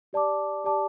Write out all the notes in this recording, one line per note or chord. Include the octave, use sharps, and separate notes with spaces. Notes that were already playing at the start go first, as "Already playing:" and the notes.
G4 D5 A5 D6
G4 D5 A5 D6